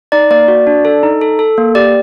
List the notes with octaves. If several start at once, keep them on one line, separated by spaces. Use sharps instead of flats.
D#4 D5
A#3 D5
F#4
D4
A4
D#4
A4
A4
A#3
G4 D5